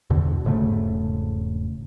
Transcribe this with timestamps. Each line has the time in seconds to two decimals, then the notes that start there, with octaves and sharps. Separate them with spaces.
0.10 E2 B2 D3
0.45 E1 G#2 C#3 A3